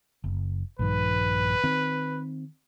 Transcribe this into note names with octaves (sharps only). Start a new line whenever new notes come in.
F#1
A#1 G2 D#3 B4
D#3 C4